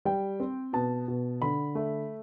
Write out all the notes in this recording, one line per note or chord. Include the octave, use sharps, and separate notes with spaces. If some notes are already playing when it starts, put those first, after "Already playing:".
G3 G5
C4
B2 A5
B2
D3 B5
A3